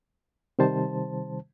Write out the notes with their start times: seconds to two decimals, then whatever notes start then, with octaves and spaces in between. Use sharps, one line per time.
0.59 C3 D#3 G3 C5 A5